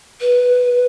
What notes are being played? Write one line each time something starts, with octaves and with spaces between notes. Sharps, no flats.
B4